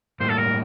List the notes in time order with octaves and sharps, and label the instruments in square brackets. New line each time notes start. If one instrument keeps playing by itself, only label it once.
[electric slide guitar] A2 G3 A#3 [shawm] C5
[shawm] A4
A#4